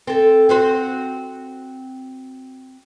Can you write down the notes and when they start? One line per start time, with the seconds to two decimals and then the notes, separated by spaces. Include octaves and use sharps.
0.07 C4 A4
0.49 C4 F#4 C5